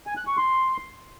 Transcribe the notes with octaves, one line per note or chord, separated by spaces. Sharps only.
G#5
F#6
C#6
C6